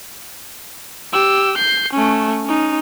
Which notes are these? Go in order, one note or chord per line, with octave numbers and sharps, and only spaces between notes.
G4 E6
G6 C7
A3 C#4
C#4 D#4